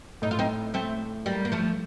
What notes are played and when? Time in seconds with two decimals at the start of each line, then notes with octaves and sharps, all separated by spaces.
0.22 A2 D#4
0.31 F4
0.39 C4 D#4
0.74 A3 C4
1.26 G3 A#3
1.45 A#3
1.52 F3 A3